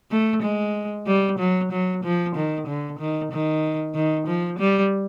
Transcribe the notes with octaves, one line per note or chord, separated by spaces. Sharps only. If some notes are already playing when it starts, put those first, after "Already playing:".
A3
G#3
G3
F#3
F#3
F3
D#3
D3
D#3
D#3
D#3
F3
G3